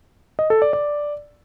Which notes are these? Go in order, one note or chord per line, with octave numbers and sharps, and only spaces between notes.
D#5
A4
D5
D5